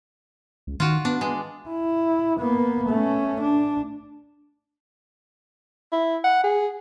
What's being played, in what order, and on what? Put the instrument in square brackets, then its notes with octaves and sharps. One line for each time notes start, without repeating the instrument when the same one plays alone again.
[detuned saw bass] C#2
[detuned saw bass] D#3 [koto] F4 F#4
[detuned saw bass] B3 [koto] D4
[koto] G#3
[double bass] E4
A#3 B3
A3 C#4
D4
[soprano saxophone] E4
F#5
G#4